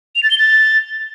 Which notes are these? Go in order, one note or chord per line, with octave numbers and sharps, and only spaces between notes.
F7
A6
G7
A6